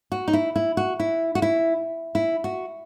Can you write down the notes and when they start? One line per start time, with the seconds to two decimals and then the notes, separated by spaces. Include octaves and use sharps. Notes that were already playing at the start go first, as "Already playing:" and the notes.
0.12 F#4
0.28 D#4
0.33 E4
0.56 E4
0.77 F#4
1.00 E4
1.35 F#4
1.42 E4
2.15 E4
2.44 F#4